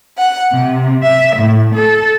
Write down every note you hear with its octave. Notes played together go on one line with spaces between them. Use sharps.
F#5
C3
E5
A2
A4